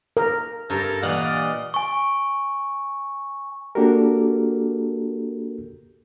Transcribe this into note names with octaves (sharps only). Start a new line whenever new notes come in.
A#4
G2 A4 A#4 A#5
G2 A#2 E3 D5 D#5 F5 F#5
G#5 C#6
A#3 D4 F#4 G4 A4 A#4